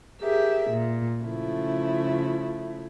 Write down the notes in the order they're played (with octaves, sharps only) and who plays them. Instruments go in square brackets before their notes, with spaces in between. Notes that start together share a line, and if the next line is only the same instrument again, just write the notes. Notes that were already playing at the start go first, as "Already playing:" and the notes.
[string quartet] G4 G#4 A#4 E5
A#2
C#3 F3 A3 E4